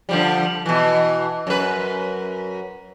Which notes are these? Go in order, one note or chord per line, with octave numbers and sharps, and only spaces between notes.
D3 F3 G3
B2 E3
F#2 B4